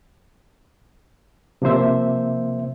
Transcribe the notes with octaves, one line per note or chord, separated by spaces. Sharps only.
C3 F3 A#3 C5 E5